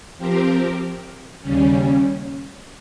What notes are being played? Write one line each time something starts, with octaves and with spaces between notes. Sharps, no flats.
F3 C4 G4 A#4
D#2 C#3 G3 C#4